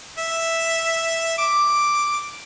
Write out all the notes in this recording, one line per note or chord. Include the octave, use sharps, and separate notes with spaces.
E5
D6